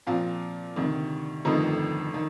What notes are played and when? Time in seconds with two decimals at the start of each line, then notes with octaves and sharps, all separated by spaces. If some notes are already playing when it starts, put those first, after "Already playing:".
0.07 A#2 F3 C4 F4
0.76 D2 C3 D#3
1.45 G1 F2 D#3 A3 D#4
2.14 D#3